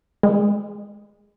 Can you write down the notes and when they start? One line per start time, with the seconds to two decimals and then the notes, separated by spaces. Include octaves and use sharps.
0.23 G#3